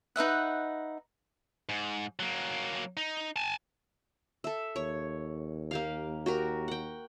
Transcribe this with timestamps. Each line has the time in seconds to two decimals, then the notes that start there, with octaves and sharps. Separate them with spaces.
0.16 D#4 B4 E5 F#5
1.69 G#2
2.19 F#3 A#3
2.97 D#4
3.36 G#5 A5
4.44 A4 E5
4.76 D#2 C#5
5.71 A#3 G4 F5
6.26 F#4 G4 A#4
6.68 F#5 G5